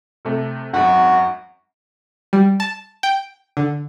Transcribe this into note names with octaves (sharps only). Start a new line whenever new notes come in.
C3 A3
G#1 F#2 F#4
G3
A5
G5
D3